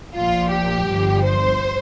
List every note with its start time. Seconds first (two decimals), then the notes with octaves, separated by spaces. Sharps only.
0.15 A#1 A#2 F3 F4
0.52 G4
0.88 G1 G2 F3
1.24 C5